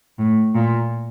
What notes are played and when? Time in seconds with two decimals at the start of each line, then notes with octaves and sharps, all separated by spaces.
0.18 A2
0.55 A#2